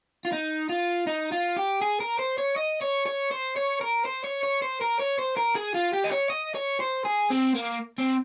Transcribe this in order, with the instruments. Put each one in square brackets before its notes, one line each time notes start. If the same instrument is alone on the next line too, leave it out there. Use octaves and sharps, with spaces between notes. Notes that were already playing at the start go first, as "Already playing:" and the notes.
[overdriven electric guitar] F4
D#4
F4
D#4
F4
G4
G#4
A#4
C5
C#5
D#5
C#5
C#5
C5
C#5
A#4
C5
C#5
C#5
C5
A#4
C#5
C5
A#4
G#4
F4
G4
D#5
C#5
D#5
C#5
C5
G#4
C4
A#3
C4